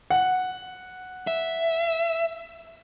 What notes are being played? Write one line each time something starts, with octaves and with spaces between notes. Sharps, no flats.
F#5
E5